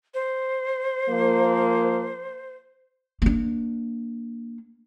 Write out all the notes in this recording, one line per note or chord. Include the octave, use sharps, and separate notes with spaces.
C5
F3 A#3
A#3 D4